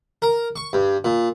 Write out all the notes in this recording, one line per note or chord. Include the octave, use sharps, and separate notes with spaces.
A#4
C#6
G2
A#2